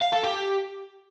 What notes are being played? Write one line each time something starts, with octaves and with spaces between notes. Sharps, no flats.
F5
A4
G4